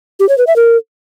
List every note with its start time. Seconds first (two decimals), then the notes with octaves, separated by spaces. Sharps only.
0.20 G4
0.29 C#5
0.38 B4
0.47 E5
0.56 A#4